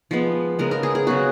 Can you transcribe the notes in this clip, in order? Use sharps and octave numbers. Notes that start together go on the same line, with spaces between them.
F3 G#3 B3
C#3 G#3 B3 A#4
A#4
G#4
G#4
C#3 F#3 B3 F#4